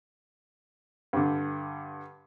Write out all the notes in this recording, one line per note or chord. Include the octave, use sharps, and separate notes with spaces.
G2 D3